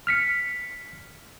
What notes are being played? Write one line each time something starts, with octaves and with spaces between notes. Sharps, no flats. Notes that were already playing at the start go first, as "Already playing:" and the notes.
F6 B6 C#7